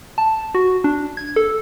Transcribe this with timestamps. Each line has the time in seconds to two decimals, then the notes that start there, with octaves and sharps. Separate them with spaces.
0.18 A5
0.55 F#4
0.84 D4
1.17 G#6
1.36 A4